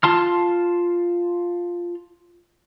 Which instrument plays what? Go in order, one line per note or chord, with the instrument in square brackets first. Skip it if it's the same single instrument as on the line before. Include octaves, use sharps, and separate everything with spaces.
[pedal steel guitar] F4 A5 C6 F6